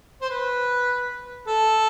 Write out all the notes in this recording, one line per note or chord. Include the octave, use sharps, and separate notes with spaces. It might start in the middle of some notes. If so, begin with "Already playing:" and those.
C5
B4
A4